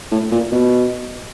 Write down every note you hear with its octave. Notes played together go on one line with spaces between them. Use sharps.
A2
A#2
B2